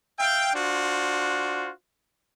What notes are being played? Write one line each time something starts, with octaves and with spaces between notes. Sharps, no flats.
E5 F5 G5
D4 F4 F#4 C5